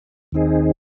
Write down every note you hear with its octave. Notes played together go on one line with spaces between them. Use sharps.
D#2 D#3 C4 D#4 G#4